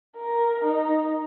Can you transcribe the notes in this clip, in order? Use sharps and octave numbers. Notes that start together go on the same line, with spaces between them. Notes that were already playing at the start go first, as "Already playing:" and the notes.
A#4
D#4